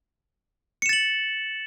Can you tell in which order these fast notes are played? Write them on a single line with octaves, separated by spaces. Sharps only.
C#7 E7 A6 F#7